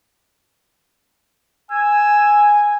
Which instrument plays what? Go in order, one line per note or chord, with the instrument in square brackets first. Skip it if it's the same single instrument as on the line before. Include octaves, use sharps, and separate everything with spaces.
[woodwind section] G#5 [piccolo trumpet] E6